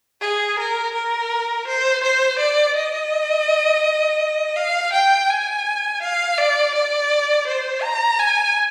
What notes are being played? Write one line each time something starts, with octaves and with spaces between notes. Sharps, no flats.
G#4
A#4
A#4
C5
C5
D5
D#5
F5
G5
G#5
F5
D5
D5
C5
A#5
G#5